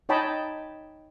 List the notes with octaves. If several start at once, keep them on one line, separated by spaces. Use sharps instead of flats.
D#4 C#5 D#5 G5 A5 B5